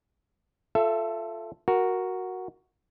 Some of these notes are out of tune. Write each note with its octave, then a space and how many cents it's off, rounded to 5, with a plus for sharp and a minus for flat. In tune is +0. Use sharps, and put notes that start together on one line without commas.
F4 +10 A4 +0 E5 +25
F#4 +0 A#4 +0